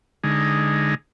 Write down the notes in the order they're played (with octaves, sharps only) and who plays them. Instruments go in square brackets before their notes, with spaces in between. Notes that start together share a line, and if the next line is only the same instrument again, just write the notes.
[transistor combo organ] D3 G#3 D#4